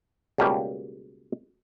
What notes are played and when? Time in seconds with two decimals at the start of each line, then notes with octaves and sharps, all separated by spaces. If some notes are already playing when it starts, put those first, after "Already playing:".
0.38 C#2 B2 G3 A#3 G4